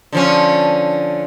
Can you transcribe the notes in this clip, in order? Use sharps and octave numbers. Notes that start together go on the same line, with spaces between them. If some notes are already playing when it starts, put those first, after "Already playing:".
D3 F3 C#4